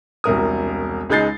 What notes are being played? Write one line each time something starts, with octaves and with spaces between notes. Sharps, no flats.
E1 C2 A#4 D#6
C#2 G#3 D#4 G6 A6 C7